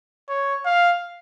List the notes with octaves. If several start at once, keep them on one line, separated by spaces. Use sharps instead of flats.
C#5
F5